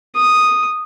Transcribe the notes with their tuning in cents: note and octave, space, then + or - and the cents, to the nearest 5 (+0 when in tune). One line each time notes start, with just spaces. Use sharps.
D#6 -5